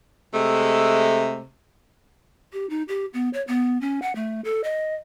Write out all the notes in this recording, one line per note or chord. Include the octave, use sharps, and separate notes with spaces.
C3 G#3 A3
G4
D#4
G4
B3
C#5
B3
C#4
F#5
A3
A4
D#5